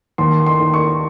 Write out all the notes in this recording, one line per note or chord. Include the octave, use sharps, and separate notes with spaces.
D#2 C6
C6
D#3
C#6